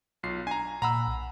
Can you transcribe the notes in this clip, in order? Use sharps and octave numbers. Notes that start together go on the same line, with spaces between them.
B1 F4 C7
D4 G#5 A#5
A#2 F#5 A#5 B5 E6
B1